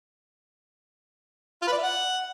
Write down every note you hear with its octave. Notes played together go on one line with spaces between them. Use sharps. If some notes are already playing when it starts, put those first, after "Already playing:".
F4
B4
D5
E4
F#5